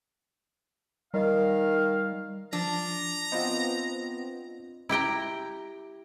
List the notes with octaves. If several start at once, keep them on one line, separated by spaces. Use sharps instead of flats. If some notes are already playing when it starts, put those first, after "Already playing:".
D#3 G3 F5
F3 D4 A#5
B3 C4 F4 D#5
E4 G4 G5 A#5